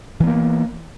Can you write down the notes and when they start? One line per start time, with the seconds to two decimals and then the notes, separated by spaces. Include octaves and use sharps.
0.20 E3
0.24 B3
0.27 A#3